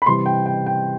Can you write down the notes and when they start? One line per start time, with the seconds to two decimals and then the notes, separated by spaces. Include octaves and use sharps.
0.02 B5
0.06 C3 E3 G3 C6
0.26 G5
0.46 G5
0.66 G5